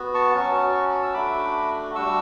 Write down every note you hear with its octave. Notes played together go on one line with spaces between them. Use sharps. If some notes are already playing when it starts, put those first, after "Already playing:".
Already playing: B3 F#4
A5 C#6
F#3 C#4 F#4
E6
A3 D4 F#4 B5 D6
G3 D4 F#4 C#6 E6